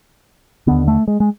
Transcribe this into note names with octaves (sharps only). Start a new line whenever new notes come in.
D#2 D3 B3
A3
G#3
G#3